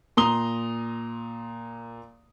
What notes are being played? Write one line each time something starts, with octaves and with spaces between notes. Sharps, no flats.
A#2 A#5 C6 D#6 G7